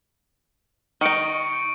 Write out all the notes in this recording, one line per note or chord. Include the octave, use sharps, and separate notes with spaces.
D#3 D#4 C#6 C#7 D7